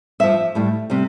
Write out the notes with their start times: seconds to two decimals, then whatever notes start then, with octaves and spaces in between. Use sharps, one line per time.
0.20 G2 F3 E5
0.55 A2 G3
0.90 C3 G3